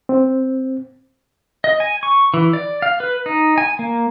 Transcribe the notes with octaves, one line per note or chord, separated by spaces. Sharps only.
C4
D#5
G#5
C#6
E3
D5
F5
B4
D#4
G#5
A#3